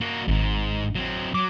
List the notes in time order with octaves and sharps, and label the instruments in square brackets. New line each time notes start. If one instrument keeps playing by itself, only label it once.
[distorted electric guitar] A#3 F#4
[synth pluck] G#1 [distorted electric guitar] D#2 G#2
[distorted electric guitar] F#3 C4
[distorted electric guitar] F#3 [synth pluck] D6